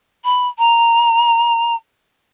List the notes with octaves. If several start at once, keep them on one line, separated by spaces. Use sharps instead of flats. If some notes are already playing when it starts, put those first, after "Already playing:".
B5
A#5